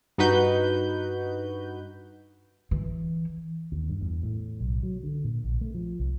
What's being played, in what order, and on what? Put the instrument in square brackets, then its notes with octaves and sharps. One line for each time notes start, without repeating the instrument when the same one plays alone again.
[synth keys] G2 D#4 F#4 B4 G6
[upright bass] E3
[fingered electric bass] D#2
G2
E2
A2
B1
F#3
D3
A#2
A#1
A3
F3
C2